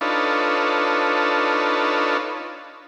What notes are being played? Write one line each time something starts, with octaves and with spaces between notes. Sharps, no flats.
D4 D#4 F4 A4 B4 C#5